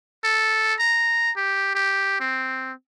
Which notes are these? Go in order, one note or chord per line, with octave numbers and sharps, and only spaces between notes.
A4
A#5
G4
G4
C4